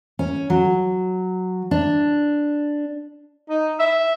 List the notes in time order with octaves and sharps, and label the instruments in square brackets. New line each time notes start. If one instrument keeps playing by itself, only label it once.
[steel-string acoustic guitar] C#4
F#3
D4
[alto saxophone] D#4
E5